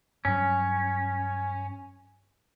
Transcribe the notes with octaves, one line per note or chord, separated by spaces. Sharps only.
G2 F#3 C#4